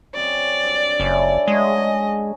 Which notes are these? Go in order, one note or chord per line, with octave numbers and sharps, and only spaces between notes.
F#2 C4 D5 D#5
G2
F#1 C#4 D4 E4
F#3 G#3 A3 F#4 D#5
G#5